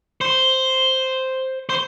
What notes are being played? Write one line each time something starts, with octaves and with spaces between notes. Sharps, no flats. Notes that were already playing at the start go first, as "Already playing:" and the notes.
C5
C5